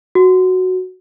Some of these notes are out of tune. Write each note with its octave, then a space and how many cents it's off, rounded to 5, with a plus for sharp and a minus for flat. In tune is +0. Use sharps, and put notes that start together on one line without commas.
F#4 +0